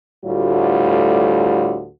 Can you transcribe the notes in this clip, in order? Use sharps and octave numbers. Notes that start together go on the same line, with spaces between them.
D2 A2 G3 F4 F#4